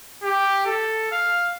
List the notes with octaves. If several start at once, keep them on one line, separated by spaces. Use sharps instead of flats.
G4
A4
F5